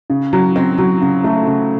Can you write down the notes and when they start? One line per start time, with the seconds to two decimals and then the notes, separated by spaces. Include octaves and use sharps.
0.10 C#3
0.33 F#3
0.56 C4
0.78 F#3
1.01 C#3
1.24 A3
1.47 C#3